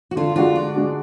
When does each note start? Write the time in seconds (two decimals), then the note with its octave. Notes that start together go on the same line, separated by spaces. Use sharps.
0.11 F#4
0.16 D3 F4
0.36 G#3 D4 F4 F#4
0.54 D3 D5
0.74 G#3 D4 F#4